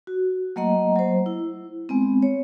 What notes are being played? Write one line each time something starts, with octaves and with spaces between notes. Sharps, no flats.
F#4
F#3 A3 A#3 D#5 F#5 A#5
F#3 C5
E4
G#3 B3 C4
C#5